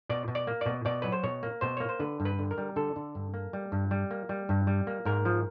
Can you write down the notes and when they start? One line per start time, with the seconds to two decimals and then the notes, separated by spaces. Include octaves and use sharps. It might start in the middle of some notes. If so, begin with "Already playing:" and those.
0.09 B2 D5
0.28 B2
0.35 D5
0.47 A#3
0.61 B2 D5
0.85 B2 D5
1.02 F#3 B4
1.12 C5
1.23 B2 C#5
1.43 A#3
1.61 B2 C5
1.77 A#3 C#5
1.89 C5
1.99 D3 B4
2.20 G2
2.25 B4
2.39 D3
2.51 A#4
2.58 G3
2.76 D3 A4
2.96 D3
3.15 G2
3.34 A#3
3.53 G3
3.72 G2
3.91 G3
4.11 A#3
4.29 G3
4.49 G2
4.67 G3
4.87 A#3
5.05 G#2 A#4
5.25 F3